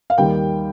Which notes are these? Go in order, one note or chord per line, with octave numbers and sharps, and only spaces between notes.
F5
D#2 D#3 G3 A#3 G5